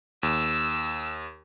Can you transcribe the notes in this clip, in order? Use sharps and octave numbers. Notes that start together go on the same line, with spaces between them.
D#2 E6